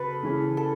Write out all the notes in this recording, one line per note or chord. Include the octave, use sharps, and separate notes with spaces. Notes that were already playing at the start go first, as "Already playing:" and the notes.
Already playing: C#3 F#4 A4 B4
C#3 E3 C#4
A4